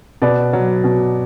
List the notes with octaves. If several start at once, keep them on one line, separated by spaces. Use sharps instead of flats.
B2 B4 D5
F#3
B2